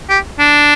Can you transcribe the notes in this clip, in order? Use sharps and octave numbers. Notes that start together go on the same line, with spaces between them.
G4
D4